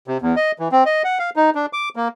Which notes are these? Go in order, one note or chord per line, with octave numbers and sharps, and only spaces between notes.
C3
E2
D#5
E3
C4
D#5
F#5
F5
D#4
D4
D6
A#3